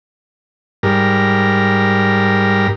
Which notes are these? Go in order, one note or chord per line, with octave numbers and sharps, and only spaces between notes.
G#2 G3 A#4